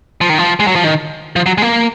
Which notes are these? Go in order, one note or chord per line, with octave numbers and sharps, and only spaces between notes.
F3
D#3
F3
G#3
F#3
F3
D#3
F3
F#3
G#3
A#3